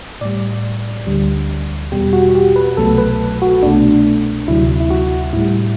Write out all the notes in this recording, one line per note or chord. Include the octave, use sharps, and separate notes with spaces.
A2 G3 D5
D2 D3 G3
E2 B2 G3 G4
F#4
G4
B4
C2 B2 F#3 A3 A4
B4
F#4
C2 B2 A3 D4
D2 C3 F#3 E4
E4
F#4
A2 G3 E4